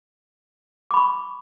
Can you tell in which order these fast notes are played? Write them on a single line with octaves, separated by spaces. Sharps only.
D6 B5 C#6